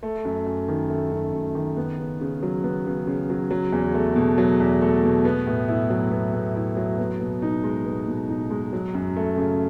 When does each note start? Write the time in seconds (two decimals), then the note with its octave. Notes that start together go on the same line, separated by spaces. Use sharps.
0.03 A3
0.25 F#2
0.47 F#2
0.68 D#3
0.90 A3
1.12 F#2
1.33 F#2
1.55 D#3
1.77 B3
1.98 C#3
2.21 C#3
2.43 F#3
2.64 B3
2.86 C#3
3.07 C#3
3.30 F#3
3.51 F#3
3.72 E2
3.94 A3
4.16 B2
4.38 F#3
4.60 E2
4.82 A3
5.03 B2
5.25 B3
5.47 A2
5.68 E4
5.90 F#3
6.11 B3
6.34 A2
6.55 E4
6.77 F#3
6.98 B3
7.21 B2
7.42 D#4
7.64 G#3
7.86 B3
8.07 B2
8.29 D#4
8.50 G#3
8.73 F#3
8.94 F#2
9.16 A3
9.38 C#3